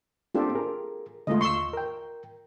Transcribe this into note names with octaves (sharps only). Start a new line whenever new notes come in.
A#3 C4 D4 F4 G4 A4
G#4 A#4
D3 G#3 A3 F4 D#5
D#2 C6 C#6 E6
A#4 G5